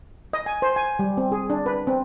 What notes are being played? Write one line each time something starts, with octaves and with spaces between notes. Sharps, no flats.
D#5
G#5
C5
G#5
G3
C4
G#4
D4
B4
C4